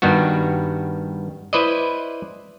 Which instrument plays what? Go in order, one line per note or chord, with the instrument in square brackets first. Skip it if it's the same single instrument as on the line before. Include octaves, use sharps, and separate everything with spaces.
[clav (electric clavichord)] G2 D#3 G3 B3 F#4
E4 B4 C5 D5 D#5